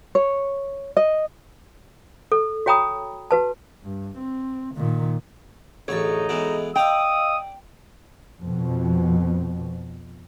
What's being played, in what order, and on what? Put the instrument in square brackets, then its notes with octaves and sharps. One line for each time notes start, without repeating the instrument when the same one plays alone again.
[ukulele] C#5
D#5
[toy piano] A4
F#4 C#5 G5 A#5 B5 D#6
F#4 B4 A5
[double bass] G2
C4
A#2 D#3
[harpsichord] A1 D2 C#6 [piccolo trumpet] D#4 [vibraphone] G#4 A4 [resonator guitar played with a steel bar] C#5
[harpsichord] B2 E3 G#3
[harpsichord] D5 A#5 [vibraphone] D#5 F5 E6 [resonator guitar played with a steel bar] G5 [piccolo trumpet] D#6
[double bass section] F2 B2